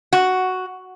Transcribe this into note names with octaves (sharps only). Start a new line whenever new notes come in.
F#4